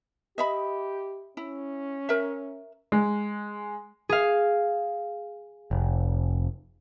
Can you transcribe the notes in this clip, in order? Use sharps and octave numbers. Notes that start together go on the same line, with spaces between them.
G4 D#5 E5 B5
C#4 E4
A#4 E5
G#3
G#4 F5
F1